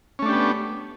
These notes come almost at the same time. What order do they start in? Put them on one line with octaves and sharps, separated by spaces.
C#4 A3 D4 G4 B3